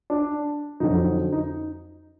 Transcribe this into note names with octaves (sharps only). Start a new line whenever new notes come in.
D4
F2 D3 F#3 D#4
D#4